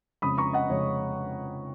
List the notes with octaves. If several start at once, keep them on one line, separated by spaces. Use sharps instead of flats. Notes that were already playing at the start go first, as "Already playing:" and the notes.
F2 C#3 G#3 C#4 B5 D#6
A#5 C#6
D#5 F#5
F2 C#3 G#3 C#4 C#5